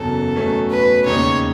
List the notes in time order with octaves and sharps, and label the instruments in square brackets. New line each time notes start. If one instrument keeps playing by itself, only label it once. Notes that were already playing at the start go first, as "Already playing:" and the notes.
Already playing: [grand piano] F#1 E2 C#3 F#3 [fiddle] A4
[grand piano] E2 B2 F#3 A3 C#4
[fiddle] B4
[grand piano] E1 D#2 C#3 G#3 D#4 [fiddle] C#5